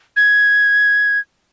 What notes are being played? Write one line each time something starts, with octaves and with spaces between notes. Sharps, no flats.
G#6